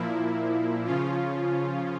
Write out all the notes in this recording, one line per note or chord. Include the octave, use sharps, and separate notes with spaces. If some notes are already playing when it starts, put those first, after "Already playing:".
Already playing: A#2 F3 A#3 E4
C#3 F3 C#4 F4